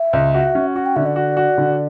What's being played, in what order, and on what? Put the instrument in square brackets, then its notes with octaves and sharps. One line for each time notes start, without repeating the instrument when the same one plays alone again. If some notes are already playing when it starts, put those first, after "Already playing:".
Already playing: [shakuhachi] E5
[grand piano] C#2
F#4
C#4
[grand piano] F#4 [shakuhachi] F#5
[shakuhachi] G5
[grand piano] D3 [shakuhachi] E5
[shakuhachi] D5
[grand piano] F#4
F#4
D3